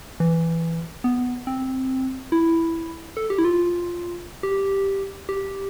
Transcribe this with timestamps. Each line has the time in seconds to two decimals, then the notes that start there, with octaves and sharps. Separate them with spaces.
0.20 E3
1.04 B3
1.47 C4
2.32 E4
3.17 A4
3.30 G4
3.38 E4
3.45 F4
4.43 G4
5.29 G4